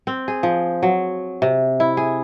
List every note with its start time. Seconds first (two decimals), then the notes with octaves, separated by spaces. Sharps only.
0.07 C4
0.28 G#4
0.43 F3
0.83 F#3
1.42 C3
1.80 E4
1.97 G#4